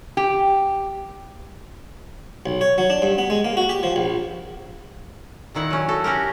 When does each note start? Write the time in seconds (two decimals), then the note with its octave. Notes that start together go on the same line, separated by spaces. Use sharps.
0.17 G4
2.46 B1
2.61 C#5
2.78 F#3
2.90 D4
3.02 G2
3.18 B3
3.30 G#3
3.44 A#3
3.57 F#4
3.69 G4
3.83 F3
3.96 A#1
5.54 A#2 D#3 E4 F#5
5.70 F#3 C#4
5.88 F#4 A4
6.04 C#4 F#4 G4 A#4